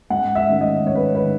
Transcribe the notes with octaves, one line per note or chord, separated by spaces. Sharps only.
G#2 F#5
E5
D#3 A3 C#4
D#5
G#2 C#5
B4
B4
D#3